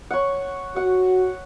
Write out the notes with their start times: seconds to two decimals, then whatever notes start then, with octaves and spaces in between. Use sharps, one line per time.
0.10 C#5 F#5
0.76 F#4 F#5